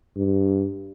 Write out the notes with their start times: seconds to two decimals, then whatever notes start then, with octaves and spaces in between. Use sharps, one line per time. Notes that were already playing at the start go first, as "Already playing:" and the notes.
0.17 G2